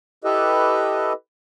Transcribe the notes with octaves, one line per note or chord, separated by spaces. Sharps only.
E4 G4 A4 B4 D#5 E5